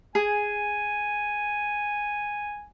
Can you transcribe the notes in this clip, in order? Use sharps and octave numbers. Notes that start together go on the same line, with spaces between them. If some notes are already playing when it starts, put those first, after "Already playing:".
G#4 G#5